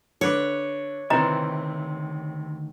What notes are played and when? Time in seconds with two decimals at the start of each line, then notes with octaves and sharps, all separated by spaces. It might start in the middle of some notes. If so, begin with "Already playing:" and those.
0.21 D3 B4 C#5 D6
1.10 D2 C3 D#3 E3 C4 D#5 A#5